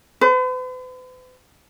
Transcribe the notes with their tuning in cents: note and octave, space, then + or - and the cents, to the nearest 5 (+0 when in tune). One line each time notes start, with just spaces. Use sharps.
B4 +45